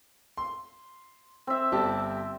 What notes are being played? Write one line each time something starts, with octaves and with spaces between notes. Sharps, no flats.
C6
C4 E5
G1 G4 A5